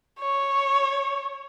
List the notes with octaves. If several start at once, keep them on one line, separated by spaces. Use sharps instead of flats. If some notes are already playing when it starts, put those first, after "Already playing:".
C#5